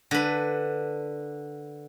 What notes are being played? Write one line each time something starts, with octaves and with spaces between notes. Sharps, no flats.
D3 B4